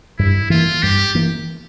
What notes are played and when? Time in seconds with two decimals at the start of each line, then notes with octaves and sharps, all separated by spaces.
0.18 G2 E4
0.50 E3 A#3 F4
0.83 G2 G4
1.15 E3 A#3